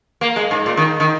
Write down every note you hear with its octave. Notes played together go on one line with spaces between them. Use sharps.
A#3
G#3
G#2
A#2
D#3
D#3